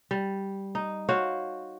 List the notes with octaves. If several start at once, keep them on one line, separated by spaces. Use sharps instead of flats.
G3
D#4
F#4 C5 C#5 F5